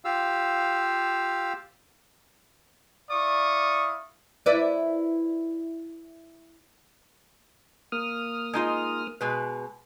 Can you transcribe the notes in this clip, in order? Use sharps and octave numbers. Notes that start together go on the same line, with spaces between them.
F4 G4 F5 E6
E4 D5 F5 C#6 D#6
E4 B4 D5
A#3 D#6 F6
G#3 D#4 F4
B2 G#3 B4